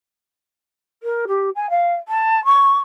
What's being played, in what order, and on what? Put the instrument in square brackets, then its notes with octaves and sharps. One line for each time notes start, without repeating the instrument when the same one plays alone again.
[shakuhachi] A#4
G4
G#5
F5
A5
C#6